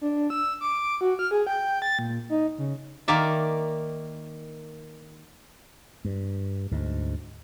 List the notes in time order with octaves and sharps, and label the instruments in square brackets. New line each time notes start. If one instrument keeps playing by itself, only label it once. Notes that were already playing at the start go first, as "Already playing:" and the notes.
[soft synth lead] D4
E6
D6
F#4
F6
G#4
G5
A6
A#2
D#4
C#3
[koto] D#3 A#3 D5 E5
[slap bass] G2
D2 G#2